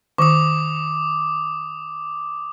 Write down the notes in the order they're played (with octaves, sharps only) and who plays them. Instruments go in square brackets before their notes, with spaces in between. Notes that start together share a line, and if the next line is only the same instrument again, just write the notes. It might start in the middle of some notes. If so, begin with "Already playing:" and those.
[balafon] D#3 [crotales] D6 D#6